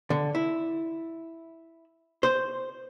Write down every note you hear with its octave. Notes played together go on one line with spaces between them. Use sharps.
D3
E4
C5